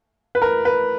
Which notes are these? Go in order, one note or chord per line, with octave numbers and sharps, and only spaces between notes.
B4
A#4
B4